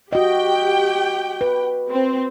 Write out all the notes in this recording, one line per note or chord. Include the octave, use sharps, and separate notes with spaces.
F#4 G4 D#5 G5
B4
C4